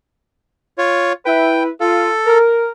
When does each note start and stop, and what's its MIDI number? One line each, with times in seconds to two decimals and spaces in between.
0.78 1.13 65
0.78 1.13 73
1.26 1.69 64
1.26 1.69 71
1.26 1.63 79
1.80 2.09 65
1.80 2.38 69
2.27 2.70 70